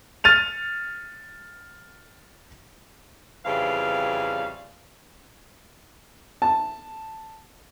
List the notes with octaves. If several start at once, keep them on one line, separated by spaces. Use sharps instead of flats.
F6 A6 D#7 F7
F2 C#3 E3 G3 F5
A5